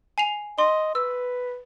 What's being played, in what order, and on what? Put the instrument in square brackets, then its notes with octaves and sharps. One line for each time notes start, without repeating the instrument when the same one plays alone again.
[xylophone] G#5 C7 F7
[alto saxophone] D#5 [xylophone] C6
[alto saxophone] B4 [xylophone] E6